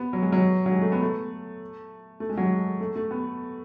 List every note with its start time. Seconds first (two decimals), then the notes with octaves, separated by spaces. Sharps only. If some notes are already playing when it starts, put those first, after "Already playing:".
Already playing: B3
0.13 F#3
0.22 G#3
0.32 F#3
0.66 F#3
0.72 G#3
0.81 A3
0.92 B3
1.01 A3
2.20 A3
2.29 G#3
2.37 F#3
2.45 G#3
2.80 A3
2.96 A3
3.11 B3